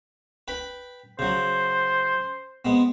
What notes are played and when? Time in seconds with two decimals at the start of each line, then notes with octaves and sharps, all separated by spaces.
0.48 B4 G5 B5
1.19 C#3 F#3 C5
2.65 G#3 B3 C4